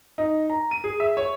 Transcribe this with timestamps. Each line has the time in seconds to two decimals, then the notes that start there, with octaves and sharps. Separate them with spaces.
0.18 D#4
0.50 A#5
0.71 D#7
0.84 G#4
1.00 E5
1.17 C#5